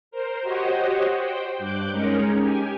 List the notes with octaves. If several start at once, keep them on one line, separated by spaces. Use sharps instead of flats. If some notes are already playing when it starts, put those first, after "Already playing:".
A#4 C5
F#4 G4 C5 C#5 D#5 F#5
C5 G5
G2 D6 F#6 G6
G#3 C#4 D#4 G#4 A#4 C#5
G4 G#5